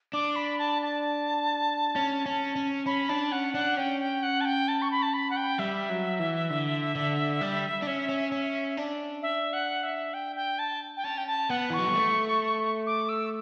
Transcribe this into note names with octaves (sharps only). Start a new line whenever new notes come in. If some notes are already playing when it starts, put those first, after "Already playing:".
D4 D6
B5
A5
A5
C#4
C#4
C#4
C#4 B5
D4 A5
C#4 F#5
D4 F#5
C#4 G5
G5
F#5
A5
G5
A5
C#6
B5
A5
B5
F#5
G5
G3 E5
F#3
E3
D3
D3
G3
D4
C#4
C#4
C#4
D4
E5
F#5
E5
G5
G5
A5
G5
C#4 A5
G5
A5
B3 F#5
E3 C#6
F#3
G3
A3
D6
E6